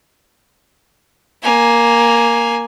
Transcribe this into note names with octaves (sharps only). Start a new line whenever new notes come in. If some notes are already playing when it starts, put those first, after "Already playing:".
A#3 G#5